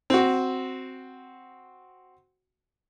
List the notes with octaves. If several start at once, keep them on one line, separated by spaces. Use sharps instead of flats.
C4 F#4